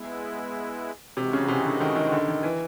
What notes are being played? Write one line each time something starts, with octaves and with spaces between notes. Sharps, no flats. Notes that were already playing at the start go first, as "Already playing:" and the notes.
Already playing: G#3 B3 E4
C3 E3 G#3 C4 D#4 F#4
C#3
C3
D3
D#3
D#3
D3
D#3
E3